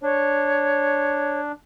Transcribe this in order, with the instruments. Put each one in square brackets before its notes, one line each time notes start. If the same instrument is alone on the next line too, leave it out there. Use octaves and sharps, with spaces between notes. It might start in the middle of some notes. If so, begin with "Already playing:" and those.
[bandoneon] D4 [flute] C#5